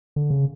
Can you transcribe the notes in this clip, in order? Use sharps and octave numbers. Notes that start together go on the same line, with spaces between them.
D3
C#3